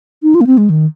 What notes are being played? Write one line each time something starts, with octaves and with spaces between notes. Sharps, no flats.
D#4
F4
A#3
C4
G#3
D#3